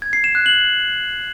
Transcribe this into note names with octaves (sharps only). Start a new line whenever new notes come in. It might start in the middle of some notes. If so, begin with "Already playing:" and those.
G#6
C7
E7
F#6
F#7